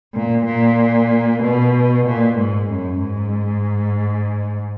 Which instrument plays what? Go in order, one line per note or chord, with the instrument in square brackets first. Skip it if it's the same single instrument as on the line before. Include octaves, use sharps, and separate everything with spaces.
[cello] A#2
A#2
B2
A#2
G#2
F#2
G#2